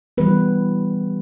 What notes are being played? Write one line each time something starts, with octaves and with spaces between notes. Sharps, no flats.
E3 G3 B3 B4